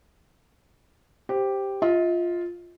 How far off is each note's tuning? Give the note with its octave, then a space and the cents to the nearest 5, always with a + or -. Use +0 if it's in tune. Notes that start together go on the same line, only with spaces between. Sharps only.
G4 +0 C5 +0
F4 +0 D#5 +45